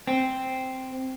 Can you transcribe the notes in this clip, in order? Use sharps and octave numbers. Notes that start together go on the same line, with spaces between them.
C4